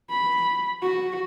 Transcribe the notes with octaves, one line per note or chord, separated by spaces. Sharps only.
B5
F#4